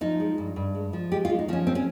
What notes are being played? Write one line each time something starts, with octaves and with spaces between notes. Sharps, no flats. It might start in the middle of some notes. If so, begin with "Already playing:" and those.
F3 D#4
G#3
G2
G2
G#3
F3
G#3 G4
F4
G#3
D#4
F3 C4 C#4
C4
C#4